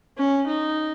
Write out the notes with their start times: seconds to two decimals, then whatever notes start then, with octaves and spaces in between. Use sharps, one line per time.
0.18 C#4
0.47 D#4